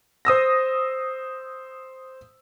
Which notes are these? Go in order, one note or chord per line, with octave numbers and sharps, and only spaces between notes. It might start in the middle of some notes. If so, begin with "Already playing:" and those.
C5 D#6 E6 A#6